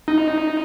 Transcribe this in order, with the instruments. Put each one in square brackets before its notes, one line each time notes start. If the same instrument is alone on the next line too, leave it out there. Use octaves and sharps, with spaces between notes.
[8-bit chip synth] D#4